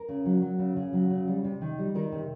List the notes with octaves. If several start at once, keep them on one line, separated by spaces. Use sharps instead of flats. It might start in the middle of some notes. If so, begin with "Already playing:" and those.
Already playing: A#4
C#3
F#3
F#3
C#3
C#3
F#3
C#3
G3
C3
D#3
G3
D#3 A#4
C3